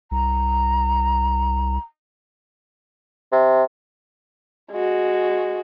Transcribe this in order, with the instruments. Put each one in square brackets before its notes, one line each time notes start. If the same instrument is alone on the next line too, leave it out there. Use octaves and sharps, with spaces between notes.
[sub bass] C2 [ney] A#5
[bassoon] C3
[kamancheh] G#3 F#4